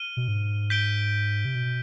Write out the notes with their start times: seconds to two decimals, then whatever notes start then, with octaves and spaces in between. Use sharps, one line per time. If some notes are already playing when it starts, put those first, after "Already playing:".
Already playing: F6 D#7 G7
0.17 B2
0.28 G#2
0.70 G6 B6 D7 G7
1.45 C3
1.55 B2